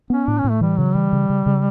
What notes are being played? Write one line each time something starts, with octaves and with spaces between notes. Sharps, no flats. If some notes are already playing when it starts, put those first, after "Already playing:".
B3 C#4
A2 D4
C#4
A2
A3
E3 G3
C#3 F#3
E3 G3
C#3
C#3
C#3